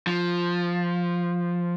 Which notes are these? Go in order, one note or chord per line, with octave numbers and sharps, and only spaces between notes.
F3